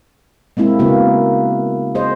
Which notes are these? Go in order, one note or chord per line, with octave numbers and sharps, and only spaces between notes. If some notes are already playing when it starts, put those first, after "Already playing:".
G#3 A#3 C4 E4
C#3 A#3 B3 F#4
G#4 C5 D#5